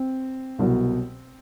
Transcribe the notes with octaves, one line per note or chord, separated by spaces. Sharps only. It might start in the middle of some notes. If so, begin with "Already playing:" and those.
Already playing: C4
C2 B2 F#3